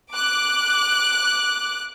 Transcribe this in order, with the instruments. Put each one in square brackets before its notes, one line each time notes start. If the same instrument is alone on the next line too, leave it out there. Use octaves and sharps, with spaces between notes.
[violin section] D6 F#6